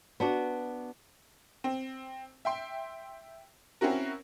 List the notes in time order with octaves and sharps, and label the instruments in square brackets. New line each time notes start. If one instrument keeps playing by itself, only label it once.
[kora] B3 D4 F#4
[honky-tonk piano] C4
E5 G5 C6
C4 C#4 E4 F#4 A#4